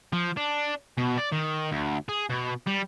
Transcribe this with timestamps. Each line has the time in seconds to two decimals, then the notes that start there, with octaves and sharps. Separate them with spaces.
0.13 F3
0.37 D4
0.98 B2
1.18 D5
1.32 D#3
1.71 D2
2.09 G#4
2.30 B2
2.67 G3